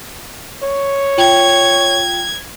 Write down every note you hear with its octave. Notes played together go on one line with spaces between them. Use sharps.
C#5
F4 G5 G#6